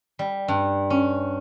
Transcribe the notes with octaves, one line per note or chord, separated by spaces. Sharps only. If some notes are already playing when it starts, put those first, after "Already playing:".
G3
G2
C#4